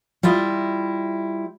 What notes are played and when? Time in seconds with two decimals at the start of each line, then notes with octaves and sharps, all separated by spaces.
0.23 G3 E4 F4 D#5